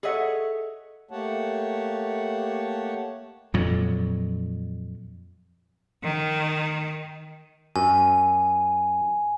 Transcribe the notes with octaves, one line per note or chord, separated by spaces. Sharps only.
G#4 A4 C#5 D#5 E5 F#5
A3 A#3 G4 C#5 F#5 A5
F2 A#2 F#3
D#3
F#2 G#5